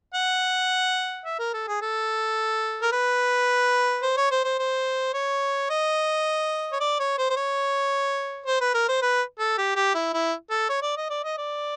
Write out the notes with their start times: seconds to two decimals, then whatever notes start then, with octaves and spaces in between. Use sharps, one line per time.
0.14 F#5
1.25 E5
1.39 A#4
1.54 A4
1.68 G#4
1.82 A4
2.82 A#4
2.92 B4
4.02 C5
4.17 C#5
4.31 C5
4.44 C5
4.59 C5
5.14 C#5
5.70 D#5
6.72 C#5
6.80 D5
6.99 C#5
7.18 C5
7.30 C5
7.36 C#5
8.46 C5
8.61 B4
8.74 A#4
8.89 C5
9.02 B4
9.39 A4
9.58 G4
9.76 G4
9.95 E4
10.14 E4
10.51 A4
10.69 C#5
10.82 D5
10.97 D#5
11.10 D5
11.24 D#5
11.38 D5